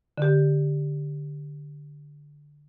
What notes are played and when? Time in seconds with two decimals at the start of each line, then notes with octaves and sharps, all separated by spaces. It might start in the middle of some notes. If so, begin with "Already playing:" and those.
0.18 D3 G4